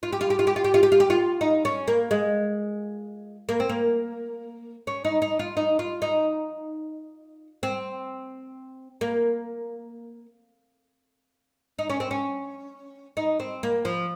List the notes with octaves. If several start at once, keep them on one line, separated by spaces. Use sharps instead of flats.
F4
G4
F4
G4
F4
G4
F4
G4
F4
G4
F4
G4
F4
D#4
C#4
A#3
G#3
A#3
C4
A#3
C#4
D#4
D#4
F4
D#4
F4
D#4
C4
A#3
D#4
C#4
C4
C#4
D#4
C4
A#3
F3